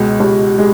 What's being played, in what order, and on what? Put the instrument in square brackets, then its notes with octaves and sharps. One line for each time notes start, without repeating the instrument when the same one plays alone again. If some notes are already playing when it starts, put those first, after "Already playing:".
Already playing: [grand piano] C#2 B2 G#3
[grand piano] C#2 [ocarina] G4
[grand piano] G#3